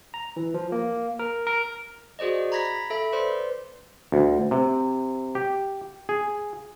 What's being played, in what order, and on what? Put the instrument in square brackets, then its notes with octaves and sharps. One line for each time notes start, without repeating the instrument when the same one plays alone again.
[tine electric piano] A#5
E3
F3
A#3
A#4
A#4
[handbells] F#4 G#4 C5 D5 D#5
A#5 B5 G#6 A#6 B6
A4 E5 B5
B4 C5 D5 C6
[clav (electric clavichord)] D2
C3
G4
G#4